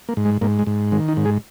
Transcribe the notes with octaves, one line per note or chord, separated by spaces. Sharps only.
A#3
G#2
G#3
G#2 A#3
G#3
G#2
D#3 G#3
D#4
G#2
G#4